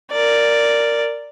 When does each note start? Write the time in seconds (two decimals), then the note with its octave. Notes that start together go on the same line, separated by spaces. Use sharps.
0.11 A#4 D5